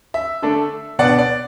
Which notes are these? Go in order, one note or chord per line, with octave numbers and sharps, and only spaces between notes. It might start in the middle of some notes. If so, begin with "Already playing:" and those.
E5
D3 A3 D4
B2 B3 D4 D5 F#5
D5